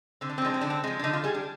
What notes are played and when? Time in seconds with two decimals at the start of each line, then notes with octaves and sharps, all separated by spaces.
0.21 D3 C4
0.29 D4
0.38 C4
0.42 F3 G#3 D4
0.54 C4
0.61 D3 D4
0.70 C4
0.84 F3 G#3
0.99 D4
1.04 D3 D#4
1.13 F4
1.24 G3 G#4
1.34 D4